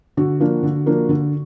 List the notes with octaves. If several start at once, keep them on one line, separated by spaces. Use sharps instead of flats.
D3 F#4
F3 A#3 D4
D3
F3 A#3 D4
D3